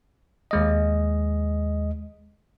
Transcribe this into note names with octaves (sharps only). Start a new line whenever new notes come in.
D#2 G#3 D#5